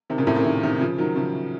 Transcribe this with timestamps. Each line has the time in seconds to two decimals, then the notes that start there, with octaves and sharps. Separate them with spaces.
0.10 C3 D#3
0.18 A#2 C#3
0.27 A2 C3
0.36 A#2 C#3
0.44 C3 D#3
0.63 C3 D#3
0.80 C#3 F3
0.98 D#3 F#3
1.16 C#3 F3